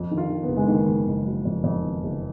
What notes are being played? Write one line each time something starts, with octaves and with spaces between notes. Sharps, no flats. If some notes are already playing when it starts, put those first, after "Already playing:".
Already playing: F2
D#3
F4
D#3
B3
F#1
G#3
D#3 A#3
F#1
F#1
F#3
F2
F2
D#3
F#1